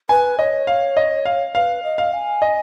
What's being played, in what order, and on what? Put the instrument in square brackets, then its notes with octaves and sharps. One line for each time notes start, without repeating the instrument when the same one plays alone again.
[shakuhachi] B4 [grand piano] G#5
[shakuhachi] C#5 [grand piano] D#5
[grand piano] F5
D#5
F5
[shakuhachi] B4 [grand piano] F5
[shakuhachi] D#5
[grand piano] F5
[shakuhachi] G#5
[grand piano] D#5